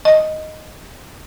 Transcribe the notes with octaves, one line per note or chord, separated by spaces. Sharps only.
D#5